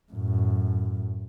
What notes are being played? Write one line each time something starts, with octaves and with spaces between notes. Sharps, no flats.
F#2 A2